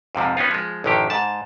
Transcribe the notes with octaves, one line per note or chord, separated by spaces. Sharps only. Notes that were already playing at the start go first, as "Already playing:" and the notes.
F2 G#2 C3 F3
B3 C#4 D#4 F4
F3 G#3
A1 F#2 D3 D#3 G4
G#2 A5